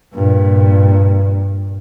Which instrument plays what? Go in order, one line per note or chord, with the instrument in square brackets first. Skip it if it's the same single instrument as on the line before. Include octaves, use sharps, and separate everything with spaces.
[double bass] G2 A#2